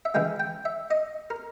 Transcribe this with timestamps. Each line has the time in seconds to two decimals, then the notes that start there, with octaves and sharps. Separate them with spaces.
0.05 E5
0.14 C#3 E3 G#3 G5
0.40 G5
0.65 E5
0.91 D#5
1.30 A#4